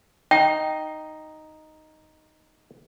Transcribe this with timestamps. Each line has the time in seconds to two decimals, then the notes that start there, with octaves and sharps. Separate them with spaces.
0.31 D#4 G5